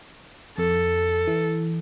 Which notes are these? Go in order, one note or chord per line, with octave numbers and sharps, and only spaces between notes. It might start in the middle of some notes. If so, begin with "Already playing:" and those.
F2 A4
E3